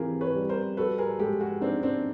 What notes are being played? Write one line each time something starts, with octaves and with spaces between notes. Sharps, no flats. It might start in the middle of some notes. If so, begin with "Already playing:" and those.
Already playing: E3 C4 F4 G4 G#4 A#4
B4 C#5
G3
A#4 C5
F#4 A4 B4
G#4 A#4
G#3 G4 A4
F#4 G#4
C4 D4 D#4
C4 D4